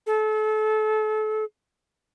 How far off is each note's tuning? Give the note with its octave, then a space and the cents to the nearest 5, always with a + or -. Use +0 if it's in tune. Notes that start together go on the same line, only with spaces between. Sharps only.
A4 -30